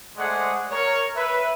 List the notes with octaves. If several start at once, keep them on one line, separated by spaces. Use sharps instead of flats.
G#3 A3 G#4 C5 D5 F#5
A#4 C#5
B4 E5